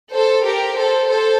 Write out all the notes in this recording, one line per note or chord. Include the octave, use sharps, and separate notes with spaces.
A4 C5
G4 A#4
A4 C5
A4 C5